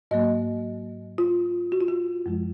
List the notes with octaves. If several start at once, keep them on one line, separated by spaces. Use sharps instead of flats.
G#2 F#3 A#3 D#5
F4
F#4
F4
F#4
F#2 F3 G#3